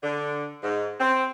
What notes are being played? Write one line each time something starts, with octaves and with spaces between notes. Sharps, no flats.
D3
G#2
C4